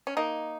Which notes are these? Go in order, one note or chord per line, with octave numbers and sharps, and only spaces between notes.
C#4
A#3 D#4